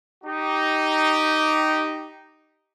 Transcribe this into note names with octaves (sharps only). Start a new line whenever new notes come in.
D#4 G4